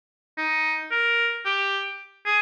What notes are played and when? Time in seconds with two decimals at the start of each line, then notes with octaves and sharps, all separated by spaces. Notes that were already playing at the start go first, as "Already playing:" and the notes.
0.38 D#4
0.91 A#4
1.45 G4
2.26 G#4